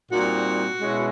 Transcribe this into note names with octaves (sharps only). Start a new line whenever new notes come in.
A#2 G3 C4 D#4 F#4
B2 G#3 C#4 E4